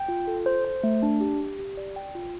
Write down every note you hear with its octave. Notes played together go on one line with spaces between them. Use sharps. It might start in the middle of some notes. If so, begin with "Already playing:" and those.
Already playing: G5
F4
A4
C5
C5
A3
D4
G4
G4
G4
D5
G5
F4